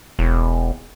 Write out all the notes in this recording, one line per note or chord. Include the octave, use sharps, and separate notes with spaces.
E1